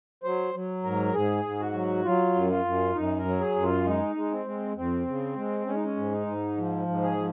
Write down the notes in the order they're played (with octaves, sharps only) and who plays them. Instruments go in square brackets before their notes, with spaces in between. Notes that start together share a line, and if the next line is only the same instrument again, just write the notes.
[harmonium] F#3 C5
F#3
G#2 A#4
G#2 G#4
G#2
F#4
F#3
F#3 F4
F#2
F4
F#2
F#2 D#4
A#4
F#3
G#4
F#2
F4
G#3 D#4
G#3
C4
G#3
F2 C4
C#3
G#3
G#3 C#4
D#4
C#4
G#2
D#4
G#2
F3
G#2
G#4
F3